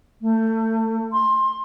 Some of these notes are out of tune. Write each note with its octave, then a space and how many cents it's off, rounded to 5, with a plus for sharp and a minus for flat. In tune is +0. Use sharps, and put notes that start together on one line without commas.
A3 +25
C6 +20